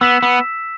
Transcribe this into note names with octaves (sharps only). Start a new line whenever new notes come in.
B3 E6 B6 E7
B3